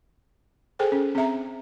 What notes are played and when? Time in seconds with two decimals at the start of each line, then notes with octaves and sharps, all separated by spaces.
0.79 G#4 A4 C5 G5 G#5
0.92 C#4
1.15 C4 G#4 E5 A#5